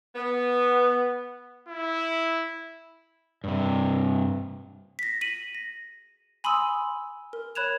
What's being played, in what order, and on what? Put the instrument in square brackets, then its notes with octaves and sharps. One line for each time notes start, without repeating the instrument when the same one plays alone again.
[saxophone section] B3
[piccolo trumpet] E4
[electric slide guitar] G2 C3
[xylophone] A#6 B6
B6 D#7 F#7
A#6
G#5 B5 C6 D#6 E6
A#4
C#5 B5 F#6 G#6 E7 F7